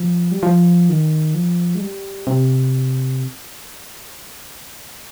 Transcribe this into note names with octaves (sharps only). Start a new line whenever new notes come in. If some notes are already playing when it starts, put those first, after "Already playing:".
Already playing: F3
G3
F3
D#3
F3
G#3
G3
C3